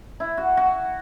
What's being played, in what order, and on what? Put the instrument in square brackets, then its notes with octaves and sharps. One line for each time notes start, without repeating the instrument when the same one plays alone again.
[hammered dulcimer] E4
F#4
F#4